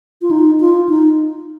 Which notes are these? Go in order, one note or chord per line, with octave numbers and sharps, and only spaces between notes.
F4
D#4
F4
D#4